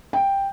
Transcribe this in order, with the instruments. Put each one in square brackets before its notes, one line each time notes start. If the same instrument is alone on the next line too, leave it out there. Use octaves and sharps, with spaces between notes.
[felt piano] G5